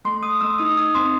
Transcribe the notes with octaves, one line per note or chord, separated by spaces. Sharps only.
A3 C6
A3 D#6
A3 E6
D#4 D#6
D#4 D#6
C4 C6